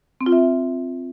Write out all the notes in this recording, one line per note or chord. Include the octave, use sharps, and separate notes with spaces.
C4
F4
E5